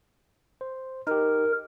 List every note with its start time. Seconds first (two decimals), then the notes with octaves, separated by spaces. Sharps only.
0.61 C5
1.07 D#4 G4 A#4